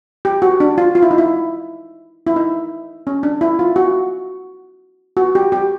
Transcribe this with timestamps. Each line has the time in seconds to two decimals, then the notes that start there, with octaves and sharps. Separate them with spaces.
0.25 G4
0.42 F#4
0.60 D4
0.78 F4
0.95 F4
1.02 E4
1.11 D#4
1.18 E4
2.27 E4
2.36 D#4
3.07 C#4
3.23 D4
3.41 E4
3.59 F4
3.76 F#4
5.17 F#4
5.35 G4
5.52 G4